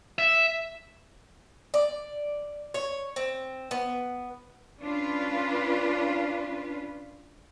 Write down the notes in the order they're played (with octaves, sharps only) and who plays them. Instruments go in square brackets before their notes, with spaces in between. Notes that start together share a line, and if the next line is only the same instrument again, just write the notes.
[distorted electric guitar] E5
[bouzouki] D5
C#5
C4
B3
[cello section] C#4 D4 F4 B4